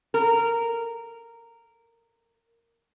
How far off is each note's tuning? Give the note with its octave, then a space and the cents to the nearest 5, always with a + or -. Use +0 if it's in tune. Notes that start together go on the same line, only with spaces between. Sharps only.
A#4 -10